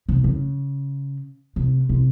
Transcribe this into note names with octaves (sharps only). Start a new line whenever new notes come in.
C3
C#3
C3
C3